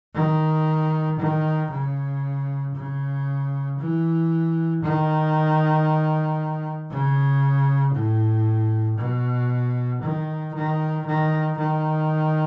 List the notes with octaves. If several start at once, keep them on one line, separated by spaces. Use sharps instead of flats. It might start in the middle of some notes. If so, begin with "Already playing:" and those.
D#3
D#3
C#3
C#3
E3
D#3
C#3
A2
B2
D#3
D#3
D#3
D#3